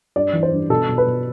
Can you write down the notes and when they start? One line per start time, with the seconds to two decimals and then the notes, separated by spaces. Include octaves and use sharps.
0.16 G2 D5
0.33 E3
0.43 C5
0.52 G2
0.70 B2 A4
0.89 B2
0.98 B4
1.07 B2